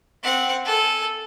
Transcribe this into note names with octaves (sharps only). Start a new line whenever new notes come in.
C4 F#5
A4 G#5